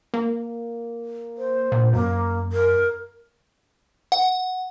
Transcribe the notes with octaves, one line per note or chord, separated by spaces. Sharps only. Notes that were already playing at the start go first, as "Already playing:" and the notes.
A#3
C5
A#2
F#2 A#3
A#4
F#5